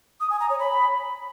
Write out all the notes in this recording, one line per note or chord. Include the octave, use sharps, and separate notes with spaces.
D#6
G#5
A#5
C#5
B5